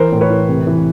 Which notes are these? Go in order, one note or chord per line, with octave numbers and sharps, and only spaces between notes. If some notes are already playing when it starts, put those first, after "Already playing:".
Already playing: E3 A#4 C5
A2
B4 C#5
E3
C3
E3